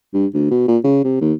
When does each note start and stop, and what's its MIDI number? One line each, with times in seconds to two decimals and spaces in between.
0.13 0.26 43
0.34 0.49 38
0.51 0.66 47
0.68 0.78 46
0.84 0.99 49
1.04 1.17 48
1.21 1.33 39